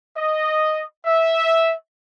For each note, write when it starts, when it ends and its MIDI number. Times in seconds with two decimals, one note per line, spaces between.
0.16 0.83 75
1.05 1.72 76